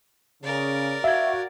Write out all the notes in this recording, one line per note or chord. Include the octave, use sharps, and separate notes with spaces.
C#3 A#4 D5
F#4 E5 F5 G#6